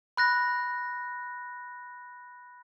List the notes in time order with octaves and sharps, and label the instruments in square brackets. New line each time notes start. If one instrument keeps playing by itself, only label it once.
[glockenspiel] B5 F#6 A#6